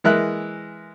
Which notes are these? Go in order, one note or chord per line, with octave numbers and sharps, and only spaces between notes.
E3 G#3 A#4 E5 F#6